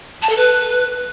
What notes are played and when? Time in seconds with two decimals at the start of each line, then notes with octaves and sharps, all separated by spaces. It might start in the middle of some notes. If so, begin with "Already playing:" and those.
0.22 A5
0.29 A4
0.37 B4